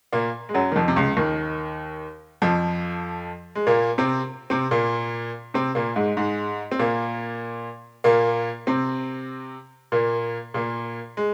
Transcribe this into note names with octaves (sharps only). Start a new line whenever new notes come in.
A#2 A#3
G#3
F#2 F#3
D#3
F2 F3
C3
C#2 C#3
D#2 D#3
F2 F3
G#3
A#2 A#3
C3 C4
C3 C4
A#2 A#3
C3 C4
A#2 A#3
G#2 G#3
G#2 G#3
C4
A#2 A#3
A#2 A#3
C3 C4
A#2 A#3
A#2 A#3
G#3